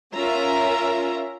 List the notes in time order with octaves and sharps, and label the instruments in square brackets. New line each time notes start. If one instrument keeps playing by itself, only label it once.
[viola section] C#4 F4 A#4 E5 A#5